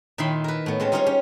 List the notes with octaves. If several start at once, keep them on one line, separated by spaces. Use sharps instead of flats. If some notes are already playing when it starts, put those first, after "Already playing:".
A#2 D#3 D#4 E4 B5 C6
A#4 B4
A2 B3
G#3 C4 C#4 A5
G3 D#4 F4 G#4 C#5 F5
C#4 G4